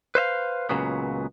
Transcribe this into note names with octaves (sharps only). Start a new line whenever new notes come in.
B4 C5 E5 F5
C#2 F#2 A#2 C#3 F#3 B3